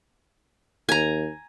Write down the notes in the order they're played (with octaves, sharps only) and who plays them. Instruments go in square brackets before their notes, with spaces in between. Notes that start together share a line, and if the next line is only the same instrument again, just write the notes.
[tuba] D#2 [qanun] G#5 A#5